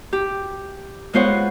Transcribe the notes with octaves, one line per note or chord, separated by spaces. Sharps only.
G4
G#3 B3 F4 C5 C#5 F#5